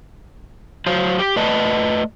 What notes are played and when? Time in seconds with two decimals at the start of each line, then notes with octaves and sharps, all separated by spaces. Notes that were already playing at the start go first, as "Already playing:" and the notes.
0.86 F#3 C5 F5
1.19 G4
1.36 A3 B4 D5 D#5 A5